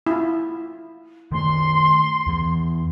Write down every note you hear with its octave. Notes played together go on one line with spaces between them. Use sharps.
E4 F4
D#3 A3 C6
E2 E3